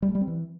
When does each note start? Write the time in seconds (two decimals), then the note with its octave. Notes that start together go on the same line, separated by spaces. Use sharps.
0.02 G3
0.09 A3
0.15 G3
0.21 C4
0.27 E3